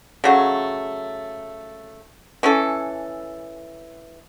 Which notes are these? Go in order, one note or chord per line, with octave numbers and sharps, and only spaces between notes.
C#3 F#3 A3
E3 C#4 A4